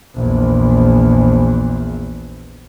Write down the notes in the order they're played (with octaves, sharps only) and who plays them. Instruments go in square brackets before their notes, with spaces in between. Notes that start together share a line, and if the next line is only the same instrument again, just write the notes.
[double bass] A#1 E2